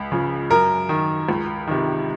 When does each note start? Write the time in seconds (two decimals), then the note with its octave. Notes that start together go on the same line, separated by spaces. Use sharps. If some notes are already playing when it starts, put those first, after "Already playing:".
Already playing: C#2
0.12 C#3 F3
0.50 F#2 A#4
0.89 D#3
1.29 C#2
1.67 C3 D#3